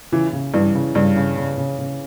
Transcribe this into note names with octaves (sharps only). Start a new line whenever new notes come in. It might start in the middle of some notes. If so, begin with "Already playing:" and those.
C#3 E3
C#3
G2 E3
C#3
G2 C#3
C#3
C#3
C#3
C#3